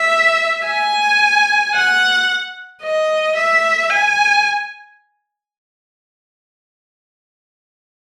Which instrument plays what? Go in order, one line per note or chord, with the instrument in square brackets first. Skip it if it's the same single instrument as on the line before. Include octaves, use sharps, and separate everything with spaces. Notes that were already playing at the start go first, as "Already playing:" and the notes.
Already playing: [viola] E5
G#5
F#5
D#5
E5
G#5